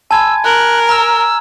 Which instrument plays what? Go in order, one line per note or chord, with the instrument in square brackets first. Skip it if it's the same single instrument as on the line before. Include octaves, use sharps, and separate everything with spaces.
[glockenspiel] G#5 G#6 [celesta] A5 B5 C6 [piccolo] E6
[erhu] A#4 [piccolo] F#6
[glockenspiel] A#5 F6 [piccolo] E6